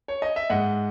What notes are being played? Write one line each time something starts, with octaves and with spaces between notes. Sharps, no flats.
C#5
D#5
E5
G#2 D#5 F#5